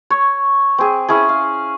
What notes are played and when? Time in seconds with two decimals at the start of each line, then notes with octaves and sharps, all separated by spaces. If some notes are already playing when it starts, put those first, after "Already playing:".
0.10 C#5
0.78 C4 G#4
1.08 C#4 E4 G#4
1.29 F5